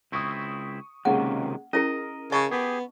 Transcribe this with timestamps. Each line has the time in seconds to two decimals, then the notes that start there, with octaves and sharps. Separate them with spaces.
0.12 C#2 C4 E4 C#6 D#6
1.05 C#2 C3 D#3 G#3 A#3 C#4 F#5
1.73 C#4 E4 G#4 A#4 D#5
2.32 C#3 D#5 A5 C#6
2.51 B3 G4 G#4